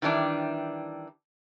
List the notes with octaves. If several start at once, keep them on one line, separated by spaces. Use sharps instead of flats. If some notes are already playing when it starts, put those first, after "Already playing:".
D#3 E3 G3 D4 E4